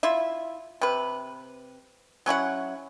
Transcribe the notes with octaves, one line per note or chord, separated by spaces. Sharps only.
E4 F4 E5
C3 B4
F#3 C#4 E4 F#5